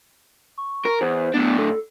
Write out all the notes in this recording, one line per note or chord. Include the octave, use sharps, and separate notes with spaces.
C#6
A#4
E2 C5
A2 B3 D4
A4